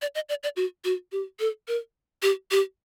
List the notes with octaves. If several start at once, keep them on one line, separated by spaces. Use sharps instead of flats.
D5
D#5
D5
D5
F#4
F#4
G4
A4
A#4
G4
G4